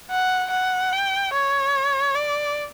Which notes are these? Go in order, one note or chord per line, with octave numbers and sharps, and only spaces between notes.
F#5
F#5
G5
C#5
D5